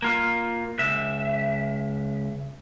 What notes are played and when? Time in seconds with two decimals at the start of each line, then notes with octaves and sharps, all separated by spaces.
0.02 A#3 F4
0.79 C#2 E5